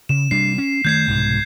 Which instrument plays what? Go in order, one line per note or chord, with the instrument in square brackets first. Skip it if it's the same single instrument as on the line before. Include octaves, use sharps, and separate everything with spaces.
[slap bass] C#3 [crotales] E7
[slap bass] C3 G3 D4 [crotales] C7
[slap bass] C#4
[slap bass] D#3 A3 [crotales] G6 G#6 C7
[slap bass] C2 G#2 B2